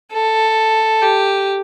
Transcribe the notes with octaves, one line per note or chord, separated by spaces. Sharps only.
A4
G4